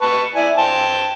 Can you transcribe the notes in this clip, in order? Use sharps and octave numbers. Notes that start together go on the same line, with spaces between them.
B4 A5 C#6
E4 D5 G#5
C5 G5 A5